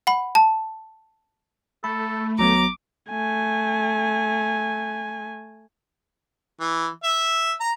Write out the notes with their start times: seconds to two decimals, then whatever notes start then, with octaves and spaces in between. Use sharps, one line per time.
0.07 F#5 B5
0.35 A5
1.84 A3 A4 B5
2.39 G#1 F#3 B3 A#5 D6
3.10 A3 G#5
6.60 E3
7.03 E5
7.60 A#5